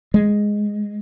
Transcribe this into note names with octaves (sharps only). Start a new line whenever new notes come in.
G#3